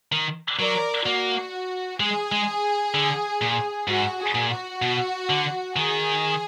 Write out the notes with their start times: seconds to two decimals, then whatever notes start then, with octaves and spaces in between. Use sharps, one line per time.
0.12 D#3
0.59 F#3 A#4 D5
1.06 A#3 F#4
2.00 G#3 G#4
2.32 G#3
2.94 D3
3.41 A#2
3.88 G#2 F#4
4.19 G#4
4.35 A#2
4.51 F#4
4.82 B2
5.30 D3
5.76 D#3 G#4